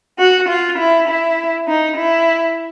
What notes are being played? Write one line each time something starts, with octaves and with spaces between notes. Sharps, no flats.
F#4
F4
E4
E4
D#4
E4